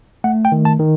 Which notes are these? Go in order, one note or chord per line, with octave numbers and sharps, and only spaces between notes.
A3 F#5
G5
D#3
A5
D#3